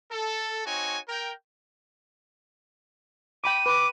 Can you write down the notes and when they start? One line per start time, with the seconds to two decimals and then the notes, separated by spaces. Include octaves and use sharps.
0.11 A4
0.65 C4 D#4 F#4 C#5 G#5
1.09 A#4 G5
3.44 G5 B5 D6 D#7
3.66 B4 D6